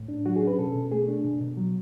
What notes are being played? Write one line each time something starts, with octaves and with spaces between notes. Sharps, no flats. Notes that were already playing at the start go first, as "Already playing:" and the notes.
Already playing: A2
D4
F#3 F#4
G#4
C#4 B4
B2 A4
B2
A3 G#4
D4
B2
B2
F#3